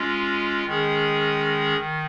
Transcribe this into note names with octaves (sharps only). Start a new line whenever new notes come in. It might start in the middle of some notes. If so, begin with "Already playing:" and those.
Already playing: G#3 C#4 F4
D#3 G#3 C#4 G#4
D#3